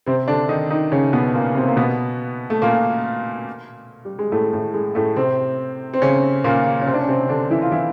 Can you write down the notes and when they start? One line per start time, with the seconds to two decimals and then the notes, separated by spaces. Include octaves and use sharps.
0.06 C3 C4
0.28 D3 D4
0.49 D#3 D#4
0.70 D#3 D#4
0.92 C#3 C#4
1.13 B2 B3
1.34 A#2 A#3
1.55 C3 C4
1.68 A#3
1.76 B2 B3
2.50 A3
2.62 A#2 A#3
4.05 G3
4.19 G#3
4.32 A2 A3
4.53 A2 A3
4.74 G#3
4.95 A2 A3
5.16 C3 C4
5.94 C4
6.02 C#3 C#4
6.44 A#2 A#3
6.81 C#4
6.86 C3 C4
6.94 D4
7.01 C#4
7.08 C3 C4
7.29 D3 D4
7.50 E3 E4
7.62 F4
7.72 E3 E4